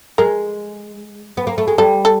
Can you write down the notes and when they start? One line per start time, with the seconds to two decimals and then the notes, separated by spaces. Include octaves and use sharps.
0.18 G#3 A#4
1.37 B3
1.47 A#3
1.58 A3
1.67 G#3
1.78 G3 A4
2.05 A4